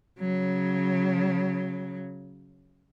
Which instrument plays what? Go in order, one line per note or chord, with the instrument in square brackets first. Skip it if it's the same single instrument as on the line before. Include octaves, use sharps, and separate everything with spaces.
[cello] C#3 F#3